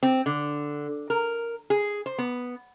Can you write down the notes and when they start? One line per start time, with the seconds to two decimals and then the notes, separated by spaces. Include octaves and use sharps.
0.03 C4
0.26 D3
1.10 A#4
1.70 G#4
2.06 C5
2.18 B3